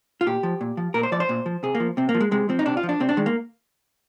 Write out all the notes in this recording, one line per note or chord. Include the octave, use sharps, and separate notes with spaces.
F4
A#2 G4
F3
A#2
F3
A#2 A#4
C5
F3 D5
C5
A#2
F3
C3 G#4
A#3
F3
C3 C4
A#3
F3
G#3
C3 G#3
F3 C4
D#4
C3 D4
F4
F3
D4
C3 C4
D4
D#3 G#3
A#3